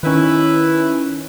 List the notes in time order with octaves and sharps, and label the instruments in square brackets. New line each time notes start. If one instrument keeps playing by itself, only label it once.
[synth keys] D#3 C#4 [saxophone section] E4 B4